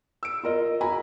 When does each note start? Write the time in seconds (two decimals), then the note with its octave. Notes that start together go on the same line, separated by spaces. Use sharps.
0.23 E6 D7
0.43 F4 A#4 D#5
0.81 F#4 G#5 A#5 B5